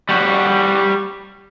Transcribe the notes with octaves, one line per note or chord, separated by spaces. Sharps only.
G3 F#4